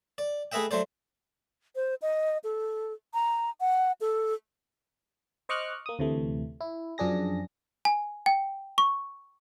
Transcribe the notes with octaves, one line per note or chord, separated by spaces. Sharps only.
D5
A3 G#4 B4 D#5 E5 G5
F#3 A3 C5 D5
C5
D#5
A4
A#5
F#5
A4
C5 D#5 C#6 D6 F6 F#6
A#3 D#6
D2 C3 E3 A3
E4
F#2 F3 D4 G#4 A#6
G#5
G5
C#6